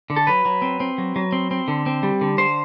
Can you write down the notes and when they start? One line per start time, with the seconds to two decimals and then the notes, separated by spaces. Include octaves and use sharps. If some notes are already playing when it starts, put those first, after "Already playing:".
0.10 D3
0.16 A4
0.27 F#3 B4
0.45 F#3
0.62 C4
0.80 C4
0.98 F#3
1.16 F#3
1.32 C4
1.51 C4
1.68 D3
1.86 C4
2.03 G3
2.21 D3
2.38 D3 C5